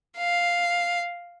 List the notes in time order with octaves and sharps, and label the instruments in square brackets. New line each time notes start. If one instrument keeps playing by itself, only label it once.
[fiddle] F5